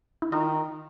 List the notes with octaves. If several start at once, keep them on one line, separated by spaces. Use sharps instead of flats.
E4
D#3 D#4 F4